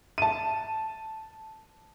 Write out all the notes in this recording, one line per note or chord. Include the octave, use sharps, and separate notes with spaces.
A5 D#7